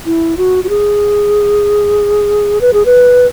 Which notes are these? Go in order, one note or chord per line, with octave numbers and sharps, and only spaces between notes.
E4
F#4
F#4
G#4
B4
G#4
B4